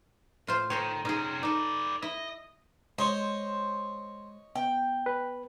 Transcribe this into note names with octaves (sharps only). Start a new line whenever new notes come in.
A2 F4 C5
D#3 A4 C5 C#5
C3 C#4 D#4 G#4
D#4 A4 B4 D5
E4 D#5
G#3 C5 C#5 D#5
B3 G5
B4